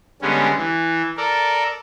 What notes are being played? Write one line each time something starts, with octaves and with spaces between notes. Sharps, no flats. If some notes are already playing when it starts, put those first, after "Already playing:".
D3 G3 G#3 B3 C#4
E3
A4 A#4 D5